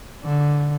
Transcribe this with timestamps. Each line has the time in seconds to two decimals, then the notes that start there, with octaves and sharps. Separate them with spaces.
0.23 D3